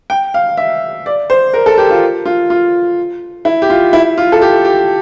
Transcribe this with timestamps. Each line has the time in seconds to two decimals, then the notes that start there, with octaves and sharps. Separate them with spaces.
0.10 G5
0.34 F5
0.57 E5
1.06 D5
1.30 C5
1.54 A#4
1.66 A4
1.78 G4
1.90 F4
2.26 F4
2.50 F4
3.45 E4
3.62 G4
3.70 F4
3.93 E4
4.18 F4
4.32 A4
4.42 G4
4.65 G4